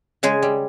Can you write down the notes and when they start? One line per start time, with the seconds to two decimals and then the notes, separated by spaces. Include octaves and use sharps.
0.23 C#3 G#3 G#4
0.42 G3